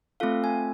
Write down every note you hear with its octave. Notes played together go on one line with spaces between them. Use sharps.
A3 C4 F4 A4 F5
G#5